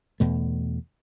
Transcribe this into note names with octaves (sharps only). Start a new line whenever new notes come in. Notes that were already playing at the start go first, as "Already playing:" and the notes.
E2 B2 A3